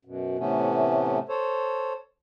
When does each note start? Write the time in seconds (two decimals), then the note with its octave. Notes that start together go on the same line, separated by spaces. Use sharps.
0.05 F#2 B2
0.38 A2 C3 E3 A3 B3 C#4
1.29 A4 C5 C#5